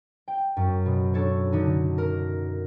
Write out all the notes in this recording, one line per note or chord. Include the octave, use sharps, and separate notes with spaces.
G5
F#2
B2
D4 A4 C#5
D3 D#4
A#4